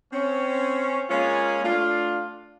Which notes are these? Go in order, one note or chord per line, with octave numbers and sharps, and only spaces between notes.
C4 C#4
G#3 A#3 C#4 F4 G#4
A3 D4 F4